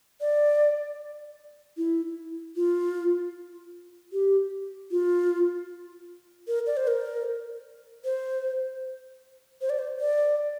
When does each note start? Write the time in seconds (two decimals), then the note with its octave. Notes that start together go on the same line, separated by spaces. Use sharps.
0.21 D5
1.77 E4
2.56 F4
4.13 G4
4.91 F4
6.48 A#4
6.67 D5
6.77 C5
6.88 A#4
8.05 C5
9.61 C5
9.70 D5
9.79 C5
10.00 D5